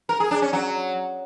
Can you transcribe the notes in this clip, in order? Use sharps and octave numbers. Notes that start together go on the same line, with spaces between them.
A#4
G#4
D4
C#4
F#3